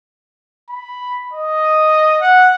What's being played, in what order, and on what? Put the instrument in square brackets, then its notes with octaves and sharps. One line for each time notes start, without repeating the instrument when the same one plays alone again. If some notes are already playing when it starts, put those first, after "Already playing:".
[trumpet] B5
D#5
F#5